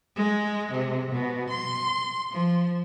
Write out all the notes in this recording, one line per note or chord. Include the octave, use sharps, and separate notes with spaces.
G#3
C3
B2
C6
F3